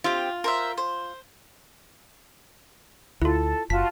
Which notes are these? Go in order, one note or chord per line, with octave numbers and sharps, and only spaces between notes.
C4 F4 G4
A#4 C5 E5
C5
D2 E4 F4 A4
F#1 F4 F#4 A5 B6